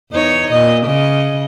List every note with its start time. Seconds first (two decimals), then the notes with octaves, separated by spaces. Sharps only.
0.11 E2 D#4 C#5
0.51 A#2 D#5
0.86 C#3 D#5